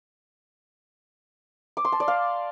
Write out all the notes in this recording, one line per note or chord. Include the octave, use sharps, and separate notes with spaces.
D6
C6
A5
D5
F5